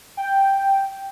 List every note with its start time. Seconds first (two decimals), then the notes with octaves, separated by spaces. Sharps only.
0.17 G5